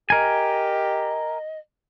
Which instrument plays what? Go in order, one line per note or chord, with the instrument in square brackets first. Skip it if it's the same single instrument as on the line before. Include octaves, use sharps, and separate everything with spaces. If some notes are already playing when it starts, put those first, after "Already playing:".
[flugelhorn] G4 [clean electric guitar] A#4 G#5 [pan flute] D#5